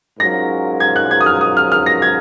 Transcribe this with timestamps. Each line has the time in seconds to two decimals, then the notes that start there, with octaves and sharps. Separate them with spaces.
0.19 G#2 F#3 C#4 F4 A#4 A#6
0.80 G#6
0.96 F#6
1.11 G#6
1.21 D#6
1.26 F6
1.41 D#6
1.57 F6
1.72 F6
1.86 A#6
2.02 G#6